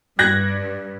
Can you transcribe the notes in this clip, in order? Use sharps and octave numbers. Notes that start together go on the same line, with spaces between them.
G2 F#6 G#6 A#6